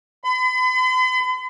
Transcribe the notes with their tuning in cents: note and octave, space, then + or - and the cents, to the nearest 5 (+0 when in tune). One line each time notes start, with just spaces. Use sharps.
B5 +45